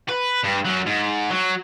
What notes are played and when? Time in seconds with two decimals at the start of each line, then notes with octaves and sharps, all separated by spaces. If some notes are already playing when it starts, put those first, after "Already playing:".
0.09 B4
0.43 G2
0.65 F#2 F#3
0.86 G#2
1.31 F#3